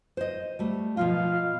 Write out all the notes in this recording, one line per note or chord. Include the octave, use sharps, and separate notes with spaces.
C5 D#5
G3 A3
B2 F3 F4 F5